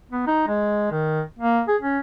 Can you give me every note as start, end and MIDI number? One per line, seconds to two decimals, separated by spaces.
0.11 0.26 59
0.27 0.47 63
0.48 0.89 56
0.91 1.21 51
1.39 1.61 58
1.68 1.76 68
1.81 1.99 61